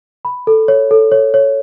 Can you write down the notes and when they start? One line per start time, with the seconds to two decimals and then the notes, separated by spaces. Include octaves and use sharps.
0.25 B5
0.47 A4
0.68 C#5
0.91 A4
1.12 C#5
1.34 C#5